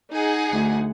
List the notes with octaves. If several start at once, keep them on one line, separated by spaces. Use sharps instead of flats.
D#4 G#4 F#5
D2